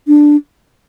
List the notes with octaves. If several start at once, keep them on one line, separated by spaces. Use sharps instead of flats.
D4